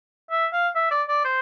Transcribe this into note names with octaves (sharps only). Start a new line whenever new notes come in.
E5
F5
E5
D5
D5
C5